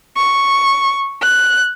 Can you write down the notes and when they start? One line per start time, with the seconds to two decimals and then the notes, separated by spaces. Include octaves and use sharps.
0.17 C#6
1.22 F#6